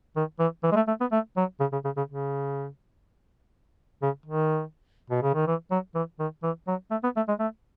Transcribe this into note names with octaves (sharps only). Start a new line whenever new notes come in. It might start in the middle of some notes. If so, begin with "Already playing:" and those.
D#3
E3
E3
G#3
A3
A3
B3
A3
F#3
C#3
C#3
C#3
C#3
C#3
C#3
D#3
B2
C#3
D#3
E3
F#3
E3
D#3
E3
F#3
A3
B3
A3
G#3
A3